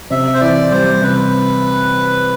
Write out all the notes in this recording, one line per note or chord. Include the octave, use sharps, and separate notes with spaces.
C3 E5
C5
E3 D5
G3 C5
C3 B4